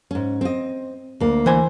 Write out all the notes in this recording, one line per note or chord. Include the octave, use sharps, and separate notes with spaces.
G#2 C#4
C4 D#5
D2 A#3
E3 C5 G#5